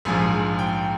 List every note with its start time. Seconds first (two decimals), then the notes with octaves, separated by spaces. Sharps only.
0.05 A#1 G#2 F3 G#5
0.59 G5